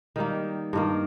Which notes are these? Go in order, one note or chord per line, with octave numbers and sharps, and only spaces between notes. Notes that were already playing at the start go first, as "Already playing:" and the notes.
D#3 G3 A#3
G2 D#3 A#3